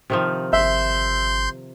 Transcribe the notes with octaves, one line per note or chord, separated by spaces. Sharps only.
C3 D#3 F3
G1 E5 C6 G6